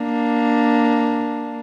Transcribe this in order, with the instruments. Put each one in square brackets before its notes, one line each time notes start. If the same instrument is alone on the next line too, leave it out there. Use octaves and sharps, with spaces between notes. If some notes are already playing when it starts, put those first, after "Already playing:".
Already playing: [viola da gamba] A#3 D4